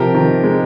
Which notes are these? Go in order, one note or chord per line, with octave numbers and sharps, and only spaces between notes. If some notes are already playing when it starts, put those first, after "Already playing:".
Already playing: C3 F3 G4 A#4
D#3
G#3